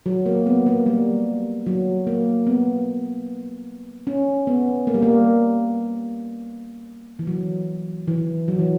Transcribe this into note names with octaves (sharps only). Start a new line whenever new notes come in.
F#3
A#3
B3
A#3
G3
F#3
A#3
B3
C#4
B3
A#3
G3
A#3
E3
F#3
E3
F#3
E3